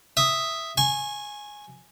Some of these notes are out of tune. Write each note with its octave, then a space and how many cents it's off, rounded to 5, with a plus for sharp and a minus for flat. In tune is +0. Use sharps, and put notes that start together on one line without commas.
E5 +0 D#6 +0
G#5 +0 C#6 -30